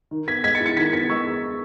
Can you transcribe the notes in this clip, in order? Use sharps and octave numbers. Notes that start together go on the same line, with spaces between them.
D#3
B3 G#6 B6
G#3 G#6 B6
A6 C#7
E4
A6 C#7
D#3 G#6 B6
B3 G#6 B6
G#3 C#6 E6